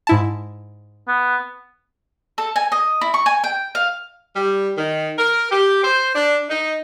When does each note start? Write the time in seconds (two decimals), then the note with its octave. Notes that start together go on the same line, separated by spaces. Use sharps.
0.07 G#2 E4 A5
1.08 B3
2.38 A4
2.56 G#5
2.72 D#5
3.01 E4
3.14 C#6
3.26 G#5
3.44 G5
3.75 F5
4.36 G3
4.77 D#3
5.18 A#4
5.52 G4
5.82 C5
6.15 D4
6.49 D#4